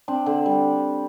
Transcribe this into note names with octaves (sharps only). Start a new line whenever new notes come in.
C4 D4
D3
G3